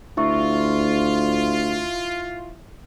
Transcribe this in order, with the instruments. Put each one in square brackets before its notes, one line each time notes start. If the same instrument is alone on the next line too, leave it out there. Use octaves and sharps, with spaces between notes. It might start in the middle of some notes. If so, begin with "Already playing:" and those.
[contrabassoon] D2 [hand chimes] E4 E5 C#6 [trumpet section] F4